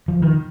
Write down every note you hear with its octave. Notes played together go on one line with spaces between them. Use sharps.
F3
D#3